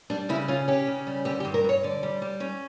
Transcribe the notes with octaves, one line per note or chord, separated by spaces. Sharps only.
G3 D4
C#3 E4
C#4 F4
C#4 G4
C#3
G3
D3 G4
G4
G2
A#4
G2 C#5
D3 D5
G3
G3
C#4